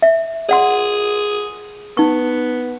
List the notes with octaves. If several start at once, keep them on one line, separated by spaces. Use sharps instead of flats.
E5
G#4 D5 F#5 C6
B3 D#4 C#6